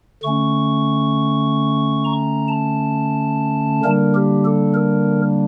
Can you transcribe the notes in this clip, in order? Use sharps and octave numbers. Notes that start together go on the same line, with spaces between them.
D3 A3 C#4 C#6
A#5
A5
D3 G3 A#3 D4 A#4
G4
A4
A#4